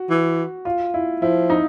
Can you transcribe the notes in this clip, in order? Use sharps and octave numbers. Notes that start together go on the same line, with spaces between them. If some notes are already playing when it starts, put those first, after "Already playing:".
Already playing: F#4
E3
F4
E4
F3 E4
D#4